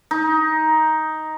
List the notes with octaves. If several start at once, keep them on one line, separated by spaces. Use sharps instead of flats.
D#4